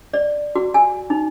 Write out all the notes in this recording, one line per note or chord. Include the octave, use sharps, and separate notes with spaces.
D5
F#4
G#5
D#4